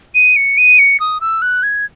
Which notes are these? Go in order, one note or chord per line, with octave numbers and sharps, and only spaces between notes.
D#7
C#7
D#7
C#7
D#6
E6
F#6
G#6